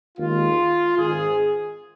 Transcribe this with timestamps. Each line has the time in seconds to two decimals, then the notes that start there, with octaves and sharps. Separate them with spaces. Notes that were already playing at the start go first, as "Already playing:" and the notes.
0.18 D#2 D#3 G#3 F4
0.98 G#1 G#2 D#3 G#4